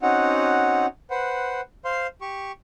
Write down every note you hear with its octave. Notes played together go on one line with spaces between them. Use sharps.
C4 C#4 D#4 F#4 F#5
B4 C5 F#5
C5 F5 C6
G4 C#6